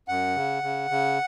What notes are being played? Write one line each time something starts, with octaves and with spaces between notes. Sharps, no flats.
F#2 F#5
C#3
C#3
C#3